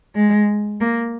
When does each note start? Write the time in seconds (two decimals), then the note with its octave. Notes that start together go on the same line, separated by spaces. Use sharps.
0.15 G#3
0.81 A#3